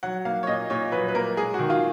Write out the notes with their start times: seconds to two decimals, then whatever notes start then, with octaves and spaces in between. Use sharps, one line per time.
0.03 F#3 F#5
0.25 A#3 F5
0.43 C#5
0.47 A#2 D#5
0.70 A#2 C#5
0.92 F#3 B4
1.08 B4
1.15 A#3 A#4
1.37 G#3 G#4
1.54 D#3 F#4
1.70 F4